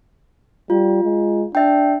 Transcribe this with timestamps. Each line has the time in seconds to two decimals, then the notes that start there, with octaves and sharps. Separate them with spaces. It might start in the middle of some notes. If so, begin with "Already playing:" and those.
0.70 G3 F4
1.04 G#3
1.55 D4 E5 G5